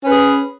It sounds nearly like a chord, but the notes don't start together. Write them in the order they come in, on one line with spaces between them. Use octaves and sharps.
C#4 B4 G#4